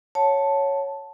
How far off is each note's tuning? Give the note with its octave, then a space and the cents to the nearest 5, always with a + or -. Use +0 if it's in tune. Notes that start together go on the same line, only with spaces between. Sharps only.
C#5 +0 F#5 -20 A5 +0